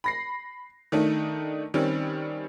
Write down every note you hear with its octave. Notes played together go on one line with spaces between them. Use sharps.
B5 A#6 C7
D#3 A3 D4 D#4
D#3 G3 C4 C#4